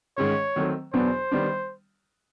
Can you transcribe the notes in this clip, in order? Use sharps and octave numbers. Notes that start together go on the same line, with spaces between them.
G#2 D#3 G#3 C#4 C#5
D#3 F#3 A3 C4
E2 B2 F#3 B3 D4 C5
D#3 G3 B3 D4